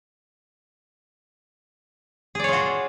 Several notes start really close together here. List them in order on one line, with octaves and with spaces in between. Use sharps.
G#4 D5 C#5 F4 F#4